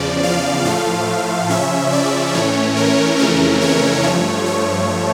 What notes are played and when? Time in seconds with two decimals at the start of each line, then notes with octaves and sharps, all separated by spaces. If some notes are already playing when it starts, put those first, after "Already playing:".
Already playing: E2 C#3 F3 D5
0.23 F5
0.65 A2 F3 A3 F5
1.49 C#3 F3 C#4 E5
1.92 D5
2.34 A2 E3 A3 C#4 C#5
2.76 A#4
3.19 F2 C#3 E3 A3 C#4 A#4
3.61 C#5
4.03 G2 F3 A3 C#5
4.46 C#5